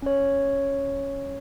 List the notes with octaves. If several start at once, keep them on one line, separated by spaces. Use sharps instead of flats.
C#4 C#5